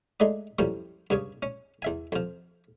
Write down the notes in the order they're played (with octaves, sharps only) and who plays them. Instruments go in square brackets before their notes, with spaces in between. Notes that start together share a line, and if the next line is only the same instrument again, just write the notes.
[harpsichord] G#3 A3 D#4 D5
F#2 A2 F3 G3
G2 C#3 C#5
C#4
E2 E5 G#5
F2 F3